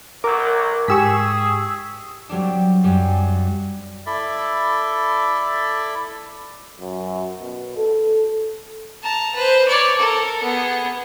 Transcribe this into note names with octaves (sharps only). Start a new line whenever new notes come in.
B1 F#3 A#4 D6
G#2 G4 G#4 C#6 E6 B6
F#3 G3 C4 D4
F#2 G3
E4 A4 D5 E5
F#2
B2
A4
A5 A#5
B4 C5
C#5 D5
A4 A#4
B3 G#4